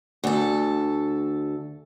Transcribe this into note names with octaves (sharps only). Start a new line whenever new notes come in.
D2 A4